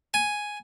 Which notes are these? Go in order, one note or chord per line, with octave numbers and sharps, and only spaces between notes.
G#5